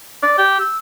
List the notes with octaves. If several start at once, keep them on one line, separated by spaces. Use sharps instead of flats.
D5
G4
E6